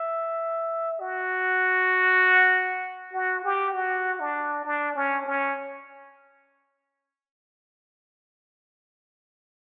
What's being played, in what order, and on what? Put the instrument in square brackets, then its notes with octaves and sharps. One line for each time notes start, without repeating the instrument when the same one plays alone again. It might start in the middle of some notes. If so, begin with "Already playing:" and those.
Already playing: [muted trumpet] E5
F#4
F#4
G4
F#4
D4
D4
C#4
C#4